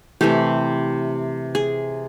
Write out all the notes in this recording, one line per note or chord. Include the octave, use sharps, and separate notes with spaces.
C3 E3 A3 G4
G#4